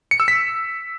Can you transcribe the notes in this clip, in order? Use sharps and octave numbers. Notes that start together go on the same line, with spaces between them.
C#7
E6
B6